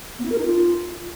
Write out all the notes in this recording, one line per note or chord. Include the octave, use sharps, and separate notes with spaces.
B3
E4
A#4
D#4
F4